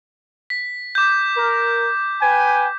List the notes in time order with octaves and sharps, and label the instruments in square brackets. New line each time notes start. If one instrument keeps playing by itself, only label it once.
[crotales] B6
D6 G6
[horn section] A#4
B4 G5 G#5